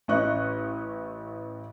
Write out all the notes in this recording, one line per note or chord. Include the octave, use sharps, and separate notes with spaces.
A1 C#4 D#5 C#6 F#6